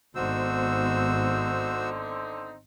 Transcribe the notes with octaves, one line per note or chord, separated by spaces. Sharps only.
G#1 D3 B3 C4 D#4 F#4 C5 E6